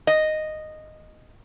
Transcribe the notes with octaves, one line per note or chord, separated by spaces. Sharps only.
D#5